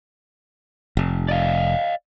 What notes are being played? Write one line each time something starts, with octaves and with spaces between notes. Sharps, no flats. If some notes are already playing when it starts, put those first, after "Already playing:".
F1
D5 D#5 F5